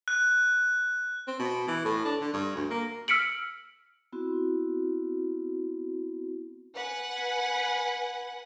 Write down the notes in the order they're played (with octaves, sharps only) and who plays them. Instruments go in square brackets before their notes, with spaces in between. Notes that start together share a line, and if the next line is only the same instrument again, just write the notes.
[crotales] F#6
[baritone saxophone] C4
B2
E3
A2
D4
D3
G2
D2
A#3
[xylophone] E6 F6 B6 C#7 D7 F#7
[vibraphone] B3 C4 E4 F#4
[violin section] B4 F#5 G#5